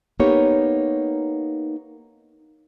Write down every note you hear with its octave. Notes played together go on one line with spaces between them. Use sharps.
A#3 B3 D#4 G4 C#5